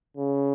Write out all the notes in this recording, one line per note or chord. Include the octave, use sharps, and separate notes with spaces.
C#3